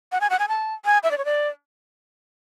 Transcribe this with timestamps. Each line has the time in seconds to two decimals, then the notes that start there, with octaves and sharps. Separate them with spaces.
0.12 F#5
0.21 G#5
0.30 F#5
0.39 G#5
0.49 A5
0.85 G#5
1.03 E5
1.11 D5
1.18 C#5
1.25 D5